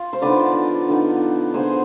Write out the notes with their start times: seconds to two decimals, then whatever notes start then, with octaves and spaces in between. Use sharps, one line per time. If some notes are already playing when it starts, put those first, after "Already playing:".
Already playing: F4
0.13 C5
0.22 D3 F3 B3 D#4 B4 D5
0.88 D3 F3 B3 D#4
1.54 D3 F3 B3 D#4 G#4 C5